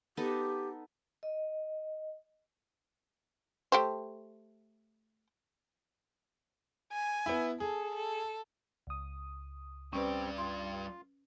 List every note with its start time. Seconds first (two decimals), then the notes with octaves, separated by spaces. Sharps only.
0.17 B3 D#4 G4 A4
1.23 D#5
3.72 A3 G4 C5
6.93 G#5
7.26 B3 E4
7.60 G#4 A4
7.95 A4
8.87 C#2 D#6
9.93 G2 G3 C4 C#4 B4 D5
10.38 F4 C6